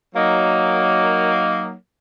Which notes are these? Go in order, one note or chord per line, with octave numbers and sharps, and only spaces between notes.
F#3 A#3 D#4